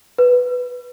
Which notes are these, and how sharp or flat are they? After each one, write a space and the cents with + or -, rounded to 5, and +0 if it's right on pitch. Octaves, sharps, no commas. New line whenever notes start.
B4 +5